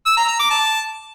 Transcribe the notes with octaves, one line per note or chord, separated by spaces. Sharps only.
E6
A#5
A#5
D6
A5